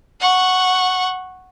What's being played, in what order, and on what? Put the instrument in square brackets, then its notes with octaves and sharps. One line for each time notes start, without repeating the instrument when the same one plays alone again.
[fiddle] F#5 C#6